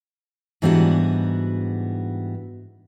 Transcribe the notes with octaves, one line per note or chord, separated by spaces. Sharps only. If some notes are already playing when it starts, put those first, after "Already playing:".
G#2 E3 G3 B3 D4 F#4